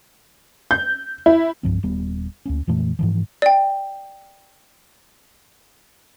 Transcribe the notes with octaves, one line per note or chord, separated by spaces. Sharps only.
G6
E4
C2 G2 F3 C4
D#1 G3 B3
D2 A#3 C#4
F2 A#2 E3 A3
G#2 E3 F3
D5 G5